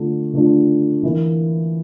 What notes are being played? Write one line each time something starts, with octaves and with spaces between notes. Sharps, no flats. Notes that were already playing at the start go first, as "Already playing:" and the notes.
Already playing: D3 A3 D4 F4
D3 A3 D4 F4
E3 A#3 E4